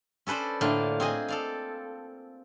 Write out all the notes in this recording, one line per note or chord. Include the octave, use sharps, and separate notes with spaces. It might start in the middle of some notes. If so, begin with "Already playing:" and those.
C#4 A4 B4 C5 D5
A2 D3 A#3 F4
C4 G#4 D#5 G#5
A4 D5 F5